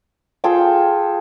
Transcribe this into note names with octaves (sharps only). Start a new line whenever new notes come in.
F4 G#4 A4 G5